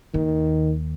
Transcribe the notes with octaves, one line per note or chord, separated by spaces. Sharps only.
D#2 D#3